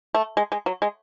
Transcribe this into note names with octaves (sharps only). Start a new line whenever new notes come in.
A3
G#3
G#3
F#3
G#3